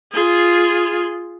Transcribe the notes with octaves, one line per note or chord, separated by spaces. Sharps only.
F4 G#4